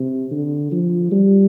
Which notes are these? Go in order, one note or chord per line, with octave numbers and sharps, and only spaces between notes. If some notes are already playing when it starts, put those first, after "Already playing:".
Already playing: C3
D3
F3
G3